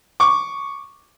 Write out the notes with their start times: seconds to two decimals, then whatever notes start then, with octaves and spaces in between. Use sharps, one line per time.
0.20 C#6 D6